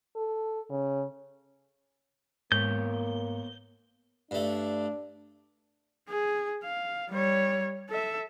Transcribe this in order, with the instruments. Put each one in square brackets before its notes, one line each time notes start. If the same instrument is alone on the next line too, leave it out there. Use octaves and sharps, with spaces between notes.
[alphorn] A4
C#3
[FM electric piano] G#2 [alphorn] A#3 [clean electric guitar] B3 A#4 C#5 [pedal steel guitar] G6
[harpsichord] G2 A3 [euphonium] D4
[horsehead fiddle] G#4
F5
G3 C#5
A4 E5